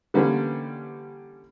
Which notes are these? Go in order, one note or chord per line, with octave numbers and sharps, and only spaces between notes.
D3 E3 G3 A#3 B3 C#4